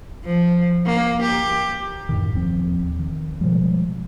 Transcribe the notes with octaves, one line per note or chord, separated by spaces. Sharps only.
F3
A#3
G4
D#1 F#2 A2 D#3
E1 D#2 F3 C4
D#3
B2 F3 G3 G#3